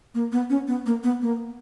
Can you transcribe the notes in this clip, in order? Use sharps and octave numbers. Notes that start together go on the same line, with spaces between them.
A#3
B3
C#4
B3
A#3
B3
A#3